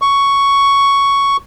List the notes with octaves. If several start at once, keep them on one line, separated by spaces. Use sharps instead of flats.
C#6